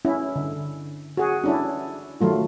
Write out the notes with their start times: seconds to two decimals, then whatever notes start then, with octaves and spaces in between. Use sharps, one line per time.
0.05 C#4 E4
0.36 D3
1.17 F#4 G#4
1.44 C#4 D4 E4
2.21 D#3 F#3 A3 F4